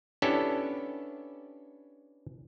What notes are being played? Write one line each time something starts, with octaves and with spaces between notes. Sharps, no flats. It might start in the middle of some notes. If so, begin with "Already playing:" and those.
B3 C#4 D4 E4 G4 A4